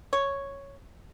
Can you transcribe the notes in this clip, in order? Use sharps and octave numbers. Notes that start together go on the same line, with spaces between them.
C#5